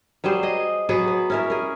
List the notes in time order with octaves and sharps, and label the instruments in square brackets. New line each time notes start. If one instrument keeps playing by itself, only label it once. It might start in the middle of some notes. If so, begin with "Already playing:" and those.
[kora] F#3 G3 G#4 C5
G#4 D#5
F#3 B3 G#4
B3
C#4 E4 A#4
G#4 A#4